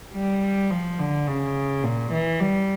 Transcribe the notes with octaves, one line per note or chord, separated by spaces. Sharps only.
G3
F3
D3
C#3
A#2
E3
G3